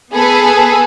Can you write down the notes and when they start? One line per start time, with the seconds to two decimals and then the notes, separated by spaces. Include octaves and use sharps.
0.12 B3 G#4 A4 B4